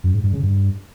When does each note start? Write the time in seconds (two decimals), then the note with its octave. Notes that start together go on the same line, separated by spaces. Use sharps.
0.04 F#2
0.14 G#2
0.23 G2
0.33 C#3
0.43 G2